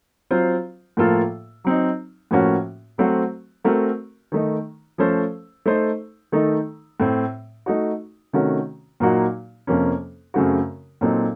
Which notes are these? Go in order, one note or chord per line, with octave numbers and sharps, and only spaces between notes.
F#3 C4 F4 C5
A2 F3 A#3 F4 A4
F#3 C4 D#4
A2 F3 A#3 C#4 F#4
F#3 A3 C4 F#4 C5
A3 C4 F#4 A#4
D#3 A3 D#4
F3 A3 C#4 A4 C5
A3 D#4 A4 C5
D#3 A3 D#4 A4
A2 A3 C4
A3 D#4 F#4
C3 D#3 A3 C#4 F#4
A#2 F#3 A#3 D#4 F#4
F2 C3 F3 A#3 C#4
F#2 C#3 A3 C4 F#4
A#2 F#3 C4 D#4 A4